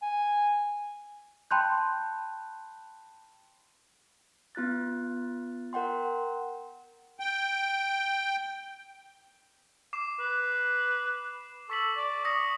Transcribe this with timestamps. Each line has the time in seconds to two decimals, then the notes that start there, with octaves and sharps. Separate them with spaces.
0.02 G#5
1.51 G5 A5 B5 C6 F#6 G6
4.55 B3 F4 F#6 A6
5.73 A#4 F#5 G5 C6
7.20 G5
9.93 D6 C7 E7
10.19 B4
11.70 A4 C#6 B6 F#7
11.97 D5
12.25 C#6 D#6 A#6